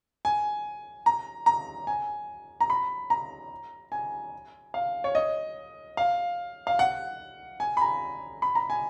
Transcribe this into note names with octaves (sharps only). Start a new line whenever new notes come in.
G#5
A#5
A#5
G#5
A#5
B5
A#5
G#5
F5
C#5
D#5
F5
F5
F#5
G#5
B5
A#5
B5
A#5
G#5